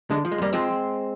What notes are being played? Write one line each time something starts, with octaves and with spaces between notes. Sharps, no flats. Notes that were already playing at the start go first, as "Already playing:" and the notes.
D3 G#3
F3
G#3
F2 G3 A#3
F3 G#3 C4